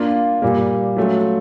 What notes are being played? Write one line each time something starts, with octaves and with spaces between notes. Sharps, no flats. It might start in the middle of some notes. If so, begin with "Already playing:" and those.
Already playing: A#3 D4 F4
A#2 G3 A#3
F#3 A3 C#4 F4